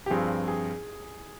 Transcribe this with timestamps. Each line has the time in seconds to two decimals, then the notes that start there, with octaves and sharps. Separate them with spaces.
0.06 G4
0.10 G2 F3 C4 F4 G#4
0.48 G#4